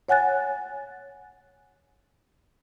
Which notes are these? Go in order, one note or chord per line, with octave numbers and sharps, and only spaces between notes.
C#5 F#5 G#5 F#6 A6